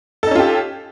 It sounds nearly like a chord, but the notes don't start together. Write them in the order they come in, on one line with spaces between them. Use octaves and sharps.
A4 D#4 C#4 F4 G4